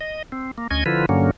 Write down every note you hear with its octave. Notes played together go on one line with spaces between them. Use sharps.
D#5
C4
A#3
D2 C#4 D#5 G#6
D3 F3 E4 F4 B4
G2 D3 F#3 A#3 C#4